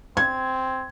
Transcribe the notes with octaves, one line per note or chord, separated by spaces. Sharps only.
C4 G#6